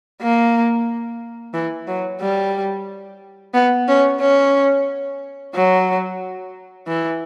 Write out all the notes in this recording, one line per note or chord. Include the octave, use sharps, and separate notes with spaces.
A#3
E3
F#3
G3
B3
C#4
C#4
F#3
E3